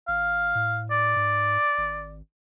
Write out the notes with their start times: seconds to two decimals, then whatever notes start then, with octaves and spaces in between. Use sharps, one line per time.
0.08 G#1 F5
0.55 A2
0.91 D5
1.16 G#2
1.78 G#1